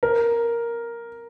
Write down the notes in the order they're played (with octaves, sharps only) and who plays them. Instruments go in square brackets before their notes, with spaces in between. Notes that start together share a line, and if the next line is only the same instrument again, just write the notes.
[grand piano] A#4